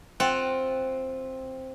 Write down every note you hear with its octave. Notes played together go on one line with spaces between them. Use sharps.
C4 F4 F#5